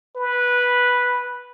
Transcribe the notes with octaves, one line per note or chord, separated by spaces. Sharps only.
B4